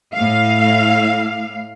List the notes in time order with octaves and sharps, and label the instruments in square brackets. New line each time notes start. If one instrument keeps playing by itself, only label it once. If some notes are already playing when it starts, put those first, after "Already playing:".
[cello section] A2 F5